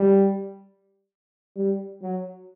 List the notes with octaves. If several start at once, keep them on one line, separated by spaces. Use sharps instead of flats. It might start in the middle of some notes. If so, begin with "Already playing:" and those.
Already playing: G3
G3
F#3